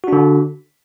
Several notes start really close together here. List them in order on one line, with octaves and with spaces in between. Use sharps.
F#4 D4 D3